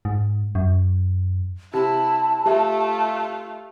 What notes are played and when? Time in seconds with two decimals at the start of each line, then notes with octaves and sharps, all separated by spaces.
0.05 G#2
0.55 F#2
1.74 C3 E4 A5
2.46 A3 F4 G4 E5